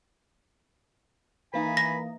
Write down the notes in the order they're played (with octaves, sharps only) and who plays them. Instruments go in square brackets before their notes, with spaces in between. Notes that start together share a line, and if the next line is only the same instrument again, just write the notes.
[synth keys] E3 A#3 D#4 [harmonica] G#5 B5
[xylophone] A#6